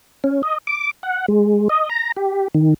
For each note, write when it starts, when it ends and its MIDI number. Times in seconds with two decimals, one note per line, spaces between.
0.24 0.42 61
0.43 0.58 75
0.67 0.91 86
1.03 1.26 78
1.28 1.68 56
1.69 1.89 75
1.90 2.12 82
2.16 2.48 67
2.54 2.74 51